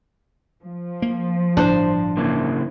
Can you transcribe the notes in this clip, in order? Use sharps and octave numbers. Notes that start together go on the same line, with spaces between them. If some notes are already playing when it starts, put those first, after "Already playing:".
F3
A#3
G1 A2 D4 C5
C#3 E3 A#3